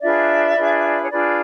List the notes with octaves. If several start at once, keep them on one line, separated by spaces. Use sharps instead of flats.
D4 F4 G#4 B4 D5 E5
D4 F4 G#4 B4
C#5
D4 F4 G#4 B4 D5